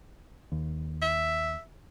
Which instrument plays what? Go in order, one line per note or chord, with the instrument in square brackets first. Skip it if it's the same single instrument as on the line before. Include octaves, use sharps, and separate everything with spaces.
[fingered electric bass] D#2
[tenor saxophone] E5